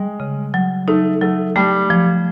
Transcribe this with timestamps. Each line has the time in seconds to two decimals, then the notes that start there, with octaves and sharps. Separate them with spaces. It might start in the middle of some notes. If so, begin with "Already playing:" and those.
Already playing: G3 G#3
0.20 C#3
0.54 F#3
0.88 A3 D#4
1.22 F#3 A3
1.56 G3 A3
1.90 F3